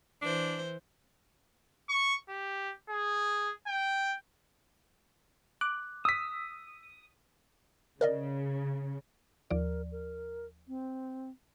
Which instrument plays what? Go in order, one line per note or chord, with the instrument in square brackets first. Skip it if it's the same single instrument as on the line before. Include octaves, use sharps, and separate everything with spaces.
[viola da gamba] E3 C5 [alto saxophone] D4
[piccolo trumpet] C#6
G4
G#4
G5
[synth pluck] D6 F#6
[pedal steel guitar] D#6 [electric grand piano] E6 B6
[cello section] C#3 [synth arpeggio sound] A#4 D5 D#5
[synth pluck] D#2 F3 D5 [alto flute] A#4
[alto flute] A#4
C4